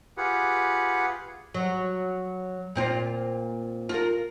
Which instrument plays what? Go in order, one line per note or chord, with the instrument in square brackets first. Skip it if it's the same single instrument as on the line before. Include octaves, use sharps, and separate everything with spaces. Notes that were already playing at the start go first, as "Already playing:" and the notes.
[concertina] F4 G4 G#4 B4 F#5
[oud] F#3
A#2 C4 F4
F4 A#4